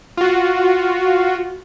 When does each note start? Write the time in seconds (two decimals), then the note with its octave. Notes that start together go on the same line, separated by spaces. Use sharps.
0.17 F4 F#4